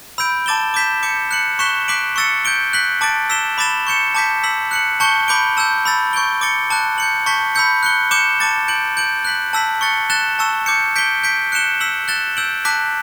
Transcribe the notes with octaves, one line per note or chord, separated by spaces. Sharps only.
B5 E6 G6 D7
A5 D6 A6 E7 G7
D6 G6 B6 E7
D6 G6 C#7
F#6 C#7 F#7
C#6 F#6 B6 E7 G7
D6 F#6 B6 D7 F#7
C#6 E6 A6 C#7
G6 D7 G7
F#6 B6 F#7
A5 D6 A6 D7
E6 B6 E7 G7
B5 D6 A6 E7 G7
C#6 G6 C#7 E7
A5 D6 G6 B6
E6 B6 F#7
F#6 C#7 F#7
A5 C#6 G6 C#7 G7
B5 D6 G6 D7 G7
A5 E6 G6
B5 E6 A6
C#6 G6 D7 G7
D6 A6 C#7 G7
A5 D6 F#6
G6 C#7 F#7
A5 C#6 G6 B6
B5 E6 G6 C#7
F#6 C#7 G7
D6 G6 C#7 E7 G7
A5 D6 A6
G6 D7 F#7
G6 D7 F#7
F#6 B6 F#7
A5 E6 B6 F#7
C#6 F#6 A6 C#7
F#6 A6 E7 G7
A5 C#6 E6
D6 G6 C#7
G6 B6 D7 G7
G6 B6 D7
F#6 C#7 E7 G7
E6 B6 F#7
F#6 A6 E7 G7
E6 G6 D7 F#7
A5 D6 F#6 B6